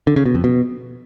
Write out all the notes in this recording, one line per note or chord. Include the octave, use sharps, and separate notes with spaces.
D3
C#3
B2
F2
B2